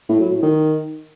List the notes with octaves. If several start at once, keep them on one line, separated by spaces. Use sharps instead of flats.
A2
F#3
A2
D#3